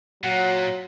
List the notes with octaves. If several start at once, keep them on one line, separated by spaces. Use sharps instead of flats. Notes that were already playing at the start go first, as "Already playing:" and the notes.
A#2 F#3 F#5